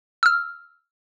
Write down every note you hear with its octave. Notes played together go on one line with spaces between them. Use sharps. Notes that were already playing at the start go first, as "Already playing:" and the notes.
E6 F6